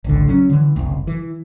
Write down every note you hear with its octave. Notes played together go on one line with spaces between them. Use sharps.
G#1 C#2 D3
F#3 C#4
D3 E3
F#1 C2
E3